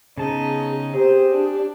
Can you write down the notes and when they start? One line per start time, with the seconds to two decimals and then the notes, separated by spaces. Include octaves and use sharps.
0.18 C#3 B3 C#4 D#4 G#4 A5
0.94 C4 G4 G#4 C5
1.33 D4